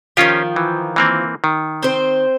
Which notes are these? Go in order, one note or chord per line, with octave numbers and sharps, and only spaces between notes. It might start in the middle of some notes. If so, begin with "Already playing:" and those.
D#3 F3 C#4 F4 G4
E3
E3 A#3 C4
D#3
C4 C5